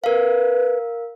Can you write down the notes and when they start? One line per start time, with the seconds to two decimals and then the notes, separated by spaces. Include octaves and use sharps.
0.04 A#4 B4 F5